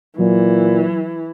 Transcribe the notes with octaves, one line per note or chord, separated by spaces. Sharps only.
A#2 E3 F#3